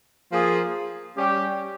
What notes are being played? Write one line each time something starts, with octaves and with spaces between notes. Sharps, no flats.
F3 A#3 F4 G#4
G3 C#4 G4